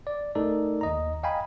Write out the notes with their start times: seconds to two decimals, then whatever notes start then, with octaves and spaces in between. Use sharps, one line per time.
0.07 D5
0.35 A3 D#4 A4 A#4 D5
0.81 D#2 D#5 A#5
1.23 D#5 F5 G5 G#5 A#5 B5